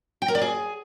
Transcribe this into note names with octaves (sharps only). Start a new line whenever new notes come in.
G5
A#4
D5
G#4